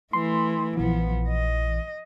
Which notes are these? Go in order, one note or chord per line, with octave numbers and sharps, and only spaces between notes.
E3 A3 C6
A#1 E3 F3 B3
D#5